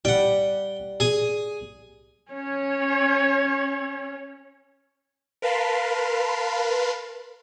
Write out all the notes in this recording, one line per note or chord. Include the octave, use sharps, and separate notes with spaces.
G3 F#5 G5
G#4 G#5
C#4 C#5
A#4 B4 F5 A5 B5 C6